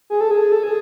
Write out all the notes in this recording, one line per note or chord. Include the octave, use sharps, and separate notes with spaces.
G#4
A4
G#4
A4
G#4